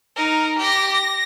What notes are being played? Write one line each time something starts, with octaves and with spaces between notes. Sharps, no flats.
D#4 A#4
G4 A#6
A#6